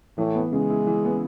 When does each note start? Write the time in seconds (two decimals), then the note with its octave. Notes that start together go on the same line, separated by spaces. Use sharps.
0.18 A2 E3
0.35 B3
0.52 C#3 G#3
0.70 E4
0.87 E3
1.05 B3